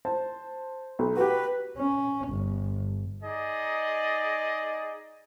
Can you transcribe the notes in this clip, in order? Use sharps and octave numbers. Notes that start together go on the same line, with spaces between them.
C5 A5
B1
F#4 G4 B4
C#4
G1
D#4 G#4 D5 D#5